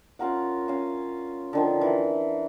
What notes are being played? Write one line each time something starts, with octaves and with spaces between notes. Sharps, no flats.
C#4 F4 A#4 F#5
C#4 F5
D3 D#3 F3
E3